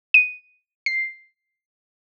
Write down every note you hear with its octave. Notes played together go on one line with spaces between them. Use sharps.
D#7
C7